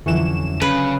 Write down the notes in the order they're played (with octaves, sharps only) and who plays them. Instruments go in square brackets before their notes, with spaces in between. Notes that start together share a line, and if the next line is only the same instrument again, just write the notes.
[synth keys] F2 E3 E7 [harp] D3 F#3 C#4
[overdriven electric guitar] C#3 [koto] B4